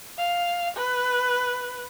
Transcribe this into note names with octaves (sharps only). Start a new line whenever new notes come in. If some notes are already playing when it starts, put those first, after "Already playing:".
F5
B4